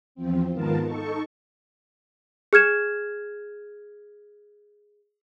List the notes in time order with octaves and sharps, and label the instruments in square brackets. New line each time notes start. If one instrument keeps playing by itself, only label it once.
[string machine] E2 F3 C4
G#2 D#3 B3 F4 A#4 A5
D#4 A4 C#6
[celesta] G#4 F6 G#6 E7